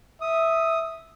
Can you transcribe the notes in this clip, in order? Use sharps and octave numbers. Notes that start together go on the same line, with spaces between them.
E5 D#6